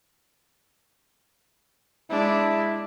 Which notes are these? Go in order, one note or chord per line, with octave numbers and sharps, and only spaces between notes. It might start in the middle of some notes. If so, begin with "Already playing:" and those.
G#3 D4 E4